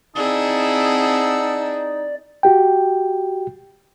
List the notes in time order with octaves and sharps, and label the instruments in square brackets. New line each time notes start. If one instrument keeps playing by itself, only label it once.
[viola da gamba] C4 E4 G#4 [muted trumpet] D#4 [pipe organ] D5 [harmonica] F#5 A5 E6
[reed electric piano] F#4 G4 G5